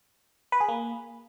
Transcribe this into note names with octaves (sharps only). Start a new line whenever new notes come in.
B4
G#4
A#3